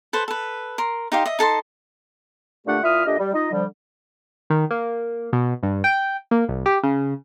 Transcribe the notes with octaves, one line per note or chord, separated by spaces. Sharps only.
A4 B4 C5
A4 B4
A#4 C6
D#4 G4 C5 F5
D#5 E5
D#4 A4 A5 C6
A#2 D3 A3 D4 G4 F#5
A#2 E4 F4 E5 D#6 F6
A#2 A3 D4 G4 D#5
G3
D#4 F4 D#5
D3 F3 G3
D#3
A#3
B2
G2
G5
A#3
C2
G4
C#3